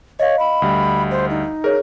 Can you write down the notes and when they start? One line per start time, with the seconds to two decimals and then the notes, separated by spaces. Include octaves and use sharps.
0.20 C#5 D#5 F5
0.39 B5
0.62 D2 G3
1.11 C5
1.30 D#4
1.64 G#4 A#4 C#5